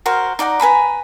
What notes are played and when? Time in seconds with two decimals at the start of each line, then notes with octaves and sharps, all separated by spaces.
0.06 F#4 A#4 C5 F5
0.39 D#4 D5 F#5 A#5
0.60 B4 G#5 A#5 B5